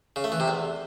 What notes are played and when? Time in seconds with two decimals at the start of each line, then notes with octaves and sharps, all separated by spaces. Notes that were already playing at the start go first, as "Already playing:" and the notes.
0.16 C#3
0.24 A3
0.32 E3
0.40 C3
0.48 E2